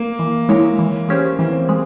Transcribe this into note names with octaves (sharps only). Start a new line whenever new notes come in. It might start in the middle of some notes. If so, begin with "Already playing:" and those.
Already playing: A#3
E3
G#3 E4 A#4 C#5
E3
G#3 C#4 G4 C5
E3 C4
G#3